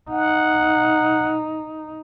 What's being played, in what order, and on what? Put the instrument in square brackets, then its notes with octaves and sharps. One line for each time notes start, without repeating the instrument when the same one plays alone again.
[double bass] D#4 [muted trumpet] F#5